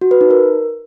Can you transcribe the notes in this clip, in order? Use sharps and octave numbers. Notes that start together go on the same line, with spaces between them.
F#4
B4
D#4
A#4